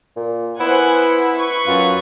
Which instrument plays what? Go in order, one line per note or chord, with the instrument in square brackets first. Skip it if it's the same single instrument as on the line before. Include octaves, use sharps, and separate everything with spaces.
[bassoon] A#2
[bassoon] B3 [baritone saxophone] E4 [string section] C5 F#5 G#5
[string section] B4 C#6
[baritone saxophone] F#2 [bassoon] F4